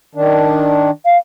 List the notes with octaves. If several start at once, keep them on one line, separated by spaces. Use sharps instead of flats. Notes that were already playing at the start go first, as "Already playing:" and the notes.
D#3 D4
F5